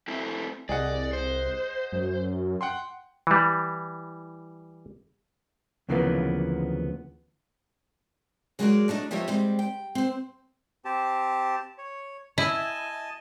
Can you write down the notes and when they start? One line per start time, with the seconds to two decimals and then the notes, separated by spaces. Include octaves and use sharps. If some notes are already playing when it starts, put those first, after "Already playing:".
0.08 A3 C4 E4
0.69 C2 G#4 D5 D#5 F#5
1.13 C5
1.92 F#2
2.61 F#5 G5 C6
3.27 E3 G3
5.89 D2 C#3 E3 F3 A#3 B3
8.59 F#3 G#3 F#4 G#4 A#4 D5
8.88 F#3 A3 D4 D#4
9.11 F3 G3 D#4 C#5 D#5 E5
9.28 G3 G#3 C4
9.59 G5
9.95 C4 C5
10.85 C4 G4 A5
11.78 C#5
12.38 E4 D#5 G#5 A5